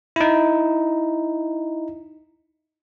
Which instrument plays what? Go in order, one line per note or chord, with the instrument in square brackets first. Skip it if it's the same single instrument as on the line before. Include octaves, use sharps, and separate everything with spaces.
[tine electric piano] D#4 E4